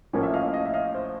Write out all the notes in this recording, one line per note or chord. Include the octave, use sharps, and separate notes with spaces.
A1 A2 F3 A#3 C#4
E5
D#5 F5
D#5 F5
E5
D#5 F5
C5